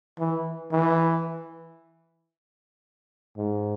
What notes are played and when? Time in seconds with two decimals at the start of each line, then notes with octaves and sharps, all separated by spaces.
0.19 E3
0.72 E3
3.37 G#2